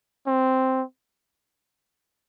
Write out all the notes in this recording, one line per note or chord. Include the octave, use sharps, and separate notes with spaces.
C4